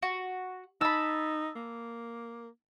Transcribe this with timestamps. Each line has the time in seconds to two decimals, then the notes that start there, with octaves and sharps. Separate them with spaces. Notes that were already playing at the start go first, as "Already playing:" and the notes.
0.02 F#4
0.81 D#4 A5 B5 E6
1.56 A#3